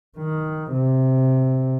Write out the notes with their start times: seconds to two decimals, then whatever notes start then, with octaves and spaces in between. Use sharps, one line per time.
0.18 D#3
0.72 C3